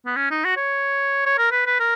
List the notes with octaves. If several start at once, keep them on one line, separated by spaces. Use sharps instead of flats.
B3
C#4
D#4
F#4
C#5
C#5
A#4
B4
B4
A#4